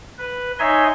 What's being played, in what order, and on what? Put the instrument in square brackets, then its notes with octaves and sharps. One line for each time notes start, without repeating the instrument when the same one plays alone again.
[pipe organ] B4
D#4 C#5 D#5 E5 G#5 C6